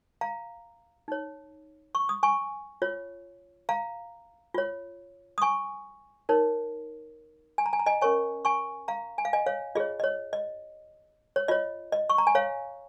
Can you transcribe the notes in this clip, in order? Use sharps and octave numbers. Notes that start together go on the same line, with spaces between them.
F5 A#5
D#4 C#5
C#6
D#6
G#5 C#6
F4 C#5
F5 A#5
F4 C#5
D#6
G#5 C#6
D#4 A#4 C#5
G#5
A#5
G#5
A#5
D#5 G#5
C#4 A#4 C#5 G#5 C#6
G#5 C#6
F5 A#5
G#5
F5
D#5 G#5
C#5 F5
F4 G#4 C#5 D#5
D#5
C#5
D#5
C#5
F4 C#5 D#5
D#5
C#6
A#5
G#5
C#5 F5